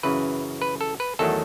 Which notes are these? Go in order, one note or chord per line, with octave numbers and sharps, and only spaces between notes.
F#2 C#3 E3 B4
B4
A4
B4
E2 D#3 F#3 A3 A4